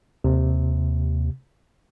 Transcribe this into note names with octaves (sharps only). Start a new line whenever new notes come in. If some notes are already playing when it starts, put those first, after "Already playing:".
D#2 C3